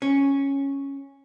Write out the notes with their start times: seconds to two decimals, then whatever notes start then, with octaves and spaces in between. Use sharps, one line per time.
0.02 C#4